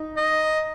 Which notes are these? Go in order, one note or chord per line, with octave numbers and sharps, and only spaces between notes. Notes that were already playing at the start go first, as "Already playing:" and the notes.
Already playing: D#4
D#5